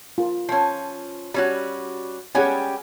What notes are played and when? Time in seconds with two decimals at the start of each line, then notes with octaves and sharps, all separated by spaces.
0.18 F4 A#4
0.49 F3 C#4
1.34 G3 C#4 F#4
2.35 G3 C#4 G4 G#4 F#5 G#5